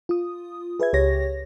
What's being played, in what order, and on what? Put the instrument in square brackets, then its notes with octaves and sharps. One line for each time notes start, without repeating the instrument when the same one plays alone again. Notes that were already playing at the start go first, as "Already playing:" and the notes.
[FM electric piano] F4 D#6
G#4 B4 E5 G#6
C#2 G4 C#5 A#6